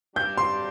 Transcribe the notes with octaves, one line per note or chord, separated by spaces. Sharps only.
G2 G3 D4 G4 G6
C6